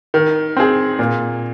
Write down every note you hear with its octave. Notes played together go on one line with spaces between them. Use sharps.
D#3
C4 G#4
A#2